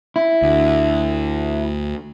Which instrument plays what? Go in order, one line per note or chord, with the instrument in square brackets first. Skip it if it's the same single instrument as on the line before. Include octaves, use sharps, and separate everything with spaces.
[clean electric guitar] E4
[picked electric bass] D2